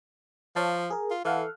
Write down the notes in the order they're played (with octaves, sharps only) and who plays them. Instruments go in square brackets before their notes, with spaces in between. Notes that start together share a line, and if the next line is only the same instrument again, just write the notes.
[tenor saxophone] F3 [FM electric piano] C#5 F5 A5
[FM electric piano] G#4 A#4
[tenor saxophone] F4
[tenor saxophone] E3 [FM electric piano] A4 F5 F#5